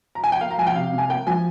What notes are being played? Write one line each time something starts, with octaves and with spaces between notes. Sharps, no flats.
A#5
G#5
G5
A#3 F5
A#5
F3 G#5
G5
C3 F5
C3
G#5
A#3 G5
F3 G#5